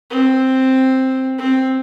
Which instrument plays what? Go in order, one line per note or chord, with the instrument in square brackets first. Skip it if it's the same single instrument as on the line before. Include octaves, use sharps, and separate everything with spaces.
[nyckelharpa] C4
C4